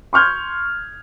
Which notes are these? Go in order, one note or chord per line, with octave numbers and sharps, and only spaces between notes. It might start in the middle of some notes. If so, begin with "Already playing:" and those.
C6 C#6 F6 G6 G#6